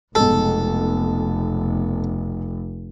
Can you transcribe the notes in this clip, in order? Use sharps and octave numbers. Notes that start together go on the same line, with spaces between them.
F1 B1 G#3 A4